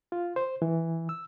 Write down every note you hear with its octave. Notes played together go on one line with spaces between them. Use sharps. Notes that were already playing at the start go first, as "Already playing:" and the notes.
F4
C5
E3
E6